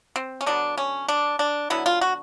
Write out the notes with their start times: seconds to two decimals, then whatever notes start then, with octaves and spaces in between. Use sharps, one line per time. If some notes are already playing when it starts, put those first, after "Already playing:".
0.16 C4
0.41 C#4
0.46 D3 F#3 B3 D4
0.78 C#4
1.08 D4
1.39 D4
1.70 D3 F#3 B3 E4
1.86 F4
2.01 F#4